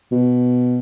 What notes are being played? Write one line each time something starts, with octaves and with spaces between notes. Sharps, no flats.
B2